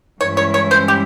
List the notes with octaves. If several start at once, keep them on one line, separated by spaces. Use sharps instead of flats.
G2 E3 G#3 C#4 E4 C#5
C#5
C#5
C5
G4